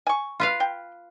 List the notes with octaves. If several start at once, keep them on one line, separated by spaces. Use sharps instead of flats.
G#5 C#6
F4 B4 F5
G5